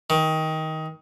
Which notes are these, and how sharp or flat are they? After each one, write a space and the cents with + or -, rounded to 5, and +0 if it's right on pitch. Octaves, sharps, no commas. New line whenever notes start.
D#3 +20